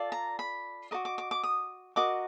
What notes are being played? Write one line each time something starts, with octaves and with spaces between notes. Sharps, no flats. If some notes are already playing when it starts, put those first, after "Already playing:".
Already playing: F4 A4 D5
A#5
B5
F#4 A#4 D#5 D6
D6
D6
D6
D#6
F#4 A#4 D#5 D6